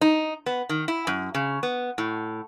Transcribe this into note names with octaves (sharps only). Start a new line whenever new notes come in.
D#4
B3
D#3
E4
F#2
C#3
B3
A2